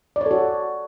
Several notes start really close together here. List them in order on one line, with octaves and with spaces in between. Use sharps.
D5 C#5 A4 F#4